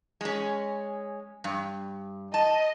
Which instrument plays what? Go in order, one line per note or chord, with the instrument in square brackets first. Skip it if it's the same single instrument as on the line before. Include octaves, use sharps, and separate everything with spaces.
[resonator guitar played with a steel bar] G#3 C#4
G2
[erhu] D#5 [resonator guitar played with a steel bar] A5